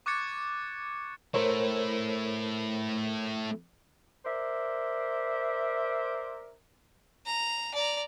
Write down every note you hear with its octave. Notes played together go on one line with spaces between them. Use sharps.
C#6 D6 F#6 G#6 A6 C#7
A3 E4 A#4 C5 C#5
A#4 C5 D5 E5
A#5
D5 A#5